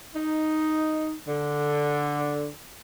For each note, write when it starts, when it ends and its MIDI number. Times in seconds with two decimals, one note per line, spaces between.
0.15 1.13 63
1.28 2.50 50